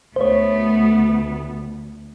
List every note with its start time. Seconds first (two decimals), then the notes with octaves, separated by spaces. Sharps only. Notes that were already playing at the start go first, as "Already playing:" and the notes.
0.16 D2 A3 B3 C5 C#5